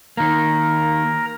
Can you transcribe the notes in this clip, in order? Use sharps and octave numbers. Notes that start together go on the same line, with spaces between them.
D#3 A#3 A#4 A#5